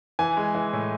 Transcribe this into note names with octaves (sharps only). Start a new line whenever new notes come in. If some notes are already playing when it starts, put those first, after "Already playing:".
E3 G#5
G#3
E3
A2